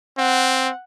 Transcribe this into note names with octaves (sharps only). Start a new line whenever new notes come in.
C4 F#5